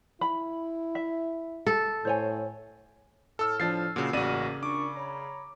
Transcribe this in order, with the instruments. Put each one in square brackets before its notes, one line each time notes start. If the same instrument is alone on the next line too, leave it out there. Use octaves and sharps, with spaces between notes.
[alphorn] E4 [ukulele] B5
[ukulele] E5
[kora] A4
[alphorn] A2 [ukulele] C5 C#5 G#5
[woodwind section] A2 F6 [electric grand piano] A4 E6
[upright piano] F3 D4 [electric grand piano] A6 C7
[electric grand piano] A#2 C#3 [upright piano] F#4
[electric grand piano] A1 F#4 [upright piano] C#3 D5 D#7 [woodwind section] A#3
[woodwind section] A#2 D4 C#6 [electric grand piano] D6
[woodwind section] C#5 A#5 B5